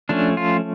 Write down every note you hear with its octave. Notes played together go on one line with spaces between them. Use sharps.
F3 A3 C#4 D4
F4